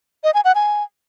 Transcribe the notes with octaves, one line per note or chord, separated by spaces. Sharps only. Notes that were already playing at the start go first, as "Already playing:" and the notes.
D#5
G#5
F#5
G#5